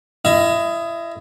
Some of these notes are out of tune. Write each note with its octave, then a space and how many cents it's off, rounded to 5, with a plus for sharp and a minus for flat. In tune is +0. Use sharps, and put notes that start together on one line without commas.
E4 +30 D#5 +5